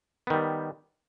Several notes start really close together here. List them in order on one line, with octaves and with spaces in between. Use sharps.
B3 D#3 G3